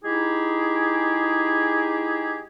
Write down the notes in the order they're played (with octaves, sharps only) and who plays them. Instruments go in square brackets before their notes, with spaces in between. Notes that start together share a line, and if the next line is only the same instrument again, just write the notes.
[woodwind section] G#3 D#4 E4 G4 G#4